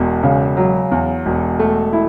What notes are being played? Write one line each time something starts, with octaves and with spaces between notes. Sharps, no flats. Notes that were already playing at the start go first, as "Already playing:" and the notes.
Already playing: E1 E2
C#3
F#3
E2
E1
A3
E4